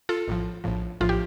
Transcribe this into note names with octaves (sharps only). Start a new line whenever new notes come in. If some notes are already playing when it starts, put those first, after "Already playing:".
F4 A4
A#1 A2 F3
A#1 A2 F3
A#1 A2 F3 F4
G4